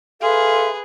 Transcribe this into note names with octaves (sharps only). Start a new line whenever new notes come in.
G#4 A4 B4 E5 F5 C6